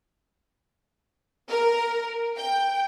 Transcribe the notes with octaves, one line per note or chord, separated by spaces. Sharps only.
A#4
G5